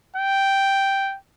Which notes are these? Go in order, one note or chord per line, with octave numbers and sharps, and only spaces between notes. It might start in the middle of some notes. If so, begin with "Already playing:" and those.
G5